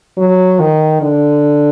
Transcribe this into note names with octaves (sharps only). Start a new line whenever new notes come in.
F#3
D#3
D3